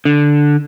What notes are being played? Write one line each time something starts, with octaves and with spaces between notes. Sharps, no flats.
D3